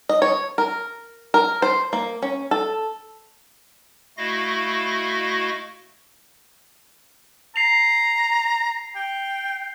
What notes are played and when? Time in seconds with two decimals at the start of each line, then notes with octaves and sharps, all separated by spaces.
0.09 D#5
0.22 C#5
0.58 A#4
1.34 A#4
1.62 C5
1.93 A#3
2.22 C#4
2.51 A4
4.18 A3 E4 F#4 D#5 F5 A#6
7.56 A#5 C7 F7
8.96 G5